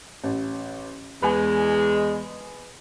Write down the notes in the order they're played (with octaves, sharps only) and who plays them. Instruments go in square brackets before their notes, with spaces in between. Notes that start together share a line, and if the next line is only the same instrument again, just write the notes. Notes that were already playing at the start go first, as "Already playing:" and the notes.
[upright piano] A1
[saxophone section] E2 G#3 [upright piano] B4 G#5